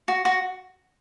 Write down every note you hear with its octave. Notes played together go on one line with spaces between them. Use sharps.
F#4
F#4